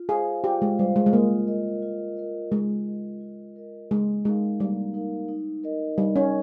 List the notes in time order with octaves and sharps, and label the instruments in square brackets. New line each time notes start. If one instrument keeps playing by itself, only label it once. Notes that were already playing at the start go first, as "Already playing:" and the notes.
Already playing: [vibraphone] F4
[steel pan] G#4 [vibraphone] C5 F5
[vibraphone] F4 [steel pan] G4
[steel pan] G#3
[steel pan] G3 [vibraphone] C5
[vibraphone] F5
[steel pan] G#3
G#3
[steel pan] A#3 [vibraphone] F4
[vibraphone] A#4 D#5
F4
A#4 D#5
[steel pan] G#3 [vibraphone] F4
[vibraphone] A#4 D#5
F4
A#4 D#5
[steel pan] G#3 [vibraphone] A#3
[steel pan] G#3 [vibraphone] D#4 A#4 F5
[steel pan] G3 [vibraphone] A#3
[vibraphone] D#4 A#4 F5
D#4
A#4 D#5
[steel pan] G3 [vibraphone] D#4
[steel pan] C#4